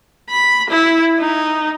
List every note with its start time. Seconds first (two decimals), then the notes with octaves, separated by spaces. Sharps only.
0.30 B5
0.69 E4
1.19 D#4